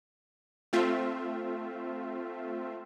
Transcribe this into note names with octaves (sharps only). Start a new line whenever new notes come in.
A3 C4 F4 E5